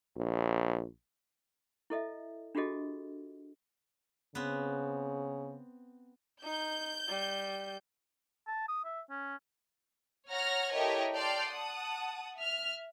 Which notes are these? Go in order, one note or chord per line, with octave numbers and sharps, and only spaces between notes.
A#1
E4 A4 D#5 E5
D4 F4 F#4 G#4 A4 D#5
C#3 B3 C4
D#4 G6
G3
A5
D#6
E5
C#4
C#5 F#5 A#5 F6 A#6
E4 G4 A4 A#4 C#5 D#5
D5 G5 A5 C6 F6 G6
F#5 A5 D#6
E5 F6